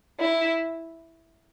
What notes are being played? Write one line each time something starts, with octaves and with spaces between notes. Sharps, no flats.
E4